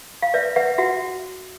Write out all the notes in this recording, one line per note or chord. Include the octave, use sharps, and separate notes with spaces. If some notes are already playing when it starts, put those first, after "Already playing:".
F5
B4 D5 E5
B4 E5 F#5
F#4 E5 F#5